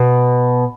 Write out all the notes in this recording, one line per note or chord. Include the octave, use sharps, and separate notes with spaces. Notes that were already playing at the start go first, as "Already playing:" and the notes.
Already playing: B2